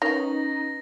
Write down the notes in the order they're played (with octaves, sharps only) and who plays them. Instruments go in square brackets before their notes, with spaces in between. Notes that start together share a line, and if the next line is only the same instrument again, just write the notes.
[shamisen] D#3 C#5 [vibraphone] C#4 B4 [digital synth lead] D#4 [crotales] A#6